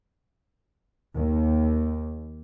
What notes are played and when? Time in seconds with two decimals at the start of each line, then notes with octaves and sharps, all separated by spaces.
1.16 D#2